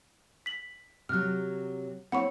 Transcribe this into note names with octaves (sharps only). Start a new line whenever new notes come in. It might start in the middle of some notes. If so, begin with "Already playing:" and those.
B6 F#7
C3 F#3 F6 F#6
C4 E4 C#5 F#5 B5 C#6